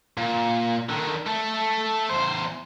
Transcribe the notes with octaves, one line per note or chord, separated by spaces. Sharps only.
A#2
D3 D#3
A3 A4
E2 C5